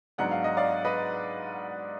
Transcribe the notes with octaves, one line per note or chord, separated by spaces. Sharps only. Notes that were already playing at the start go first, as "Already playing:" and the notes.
G#2 F#3 B3 D4 F#5
F5
D#5
D5 F5
B4 D#5